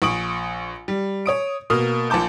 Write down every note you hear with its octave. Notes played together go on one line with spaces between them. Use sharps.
A#1 C#6 D#6 D7 F#7
G3
C#5 D#6 D7
B2 A#3 D#6 F6
A#1 A#2 A5 D6 G6